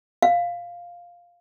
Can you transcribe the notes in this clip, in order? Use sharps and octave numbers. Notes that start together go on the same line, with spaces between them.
F5